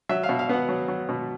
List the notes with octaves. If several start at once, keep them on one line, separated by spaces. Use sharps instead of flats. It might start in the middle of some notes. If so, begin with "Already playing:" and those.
F#3 E5
F5
B2
F5
B3 F#5
F#3
F#3
B2